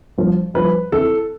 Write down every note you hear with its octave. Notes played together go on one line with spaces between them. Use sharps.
G2 F3
G2 F3 B4
F2 E3 A4